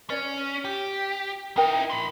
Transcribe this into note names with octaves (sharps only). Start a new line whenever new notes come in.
C#4 C#5 D5
G4
D#4 E4 A#4 G5
B5 C6